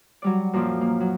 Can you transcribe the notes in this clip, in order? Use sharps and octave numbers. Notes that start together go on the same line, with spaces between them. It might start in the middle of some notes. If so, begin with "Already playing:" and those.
F#3 G3 D5
F#2 A#2 F3
A#3
F#3